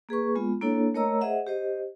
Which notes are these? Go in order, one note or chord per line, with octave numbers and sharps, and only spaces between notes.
A#3 G#4 B4 C#6
G#3 B3 F4
A#3 D4 E4 A4 C#5
A3 A#4 C#5 D#5 A#5 E6
G#4 C5 D#5 E5 F#5
G4 C5 D#5